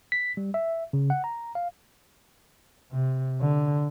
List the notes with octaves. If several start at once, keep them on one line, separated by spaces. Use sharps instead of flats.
B6
G3
E5
C#3
F#5
A#5
F5
C3
D3